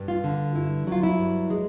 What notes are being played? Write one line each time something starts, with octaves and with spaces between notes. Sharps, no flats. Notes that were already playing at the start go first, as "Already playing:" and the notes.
Already playing: G2
F4
D3
G2 E4
F#3 F4
E4
G2
G#3